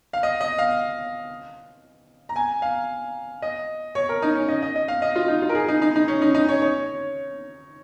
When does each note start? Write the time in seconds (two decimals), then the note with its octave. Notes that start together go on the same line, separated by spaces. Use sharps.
0.13 F5
0.23 D#5
0.41 D#5
0.58 F5
2.29 A#5
2.36 G#5
2.62 F5
3.42 D#5
3.95 C#5
4.09 A#4
4.22 D#4
4.35 C#4
4.48 D#5
4.62 D#5
4.76 D#5
4.88 F5
5.02 D#5
5.16 F4
5.28 D#4
5.42 F4
5.49 A#4
5.55 G#4
5.68 D#4
5.82 D#4
5.96 D#4
6.08 C#4
6.22 D#4
6.34 D#4
6.49 C#5
6.62 C#5